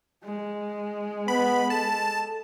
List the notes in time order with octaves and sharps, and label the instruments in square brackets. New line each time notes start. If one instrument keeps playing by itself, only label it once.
[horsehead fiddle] G#3
[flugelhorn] B3 [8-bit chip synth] B5
[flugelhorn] A4 [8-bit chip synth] A5